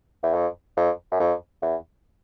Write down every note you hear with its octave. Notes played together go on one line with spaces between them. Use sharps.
E2
F2
F2
F#2
F2
E2